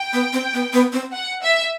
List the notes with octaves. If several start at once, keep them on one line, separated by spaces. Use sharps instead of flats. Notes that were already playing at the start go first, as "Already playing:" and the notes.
Already playing: G5
B3
C4
B3
B3
C4
F#5
E5